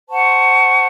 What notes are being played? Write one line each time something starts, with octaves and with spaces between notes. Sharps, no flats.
C5 F#5 A5 C#6